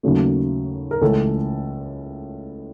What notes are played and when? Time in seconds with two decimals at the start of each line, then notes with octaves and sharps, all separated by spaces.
0.03 D#2 C#3 F#3 A3
0.91 A#4
1.01 C#2 C#3 E3 A3 C#4 A4